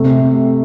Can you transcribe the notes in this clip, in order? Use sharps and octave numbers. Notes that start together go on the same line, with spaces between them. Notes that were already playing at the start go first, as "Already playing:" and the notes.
Already playing: C3 A3